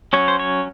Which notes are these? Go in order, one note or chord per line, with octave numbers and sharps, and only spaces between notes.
F#3 C#4 C#5
C5
C#5